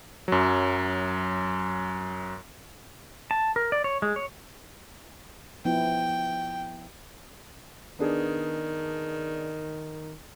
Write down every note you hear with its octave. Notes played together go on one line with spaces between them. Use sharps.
F#2 F#3
A5
A#4
D5
C#5
G#3
C#5
F3 B3 E4 G5
D#3 B3 D4 G#4